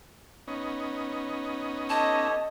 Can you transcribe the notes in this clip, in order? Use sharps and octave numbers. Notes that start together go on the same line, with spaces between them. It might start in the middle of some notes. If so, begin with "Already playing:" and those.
B3 C#4 D#4
G4 A4 C#5 D#5 A5